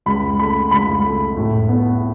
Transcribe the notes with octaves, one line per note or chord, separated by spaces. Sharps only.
C#2 B5
A3 B5
C#2 B5
A3
A2
B3